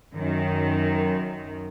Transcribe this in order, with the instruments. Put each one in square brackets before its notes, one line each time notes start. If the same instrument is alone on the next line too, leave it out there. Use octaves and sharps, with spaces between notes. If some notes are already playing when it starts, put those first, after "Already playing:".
[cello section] F#2 D#3